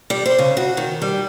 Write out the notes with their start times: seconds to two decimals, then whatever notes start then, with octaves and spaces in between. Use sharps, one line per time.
0.10 G3
0.26 C5
0.39 C#3
0.57 F#4
0.77 D#3
1.02 G3